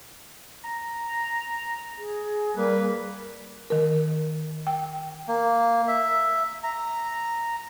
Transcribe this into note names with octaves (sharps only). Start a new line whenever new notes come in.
A#5
G#4
G3 A#3 B4
D#3 A#4
G5
A#3
E5
A#5